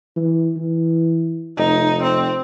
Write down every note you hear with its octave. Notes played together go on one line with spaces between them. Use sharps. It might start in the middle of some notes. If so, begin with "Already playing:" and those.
E3
E3
F1 D#4
C4